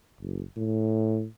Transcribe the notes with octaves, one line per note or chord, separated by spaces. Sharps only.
F#1
A2